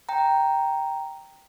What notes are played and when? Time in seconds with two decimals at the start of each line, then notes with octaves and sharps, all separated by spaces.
0.09 G5 A#5